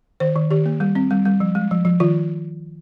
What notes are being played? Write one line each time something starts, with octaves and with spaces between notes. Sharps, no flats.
D#3 C5
D#3
D#3 G4
A#3
G3
C4
G3
G3
F3
G#3
F3
F3
D#3 F4